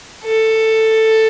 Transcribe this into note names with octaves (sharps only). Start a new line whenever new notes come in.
A4